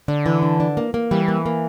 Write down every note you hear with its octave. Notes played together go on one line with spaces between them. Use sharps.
D3 D4
E3
D4
D4
A#3
A#3
E3 G3
A#3
A#3